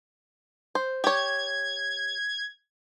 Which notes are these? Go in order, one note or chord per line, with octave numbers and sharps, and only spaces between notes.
C5
G4 C#5 G#6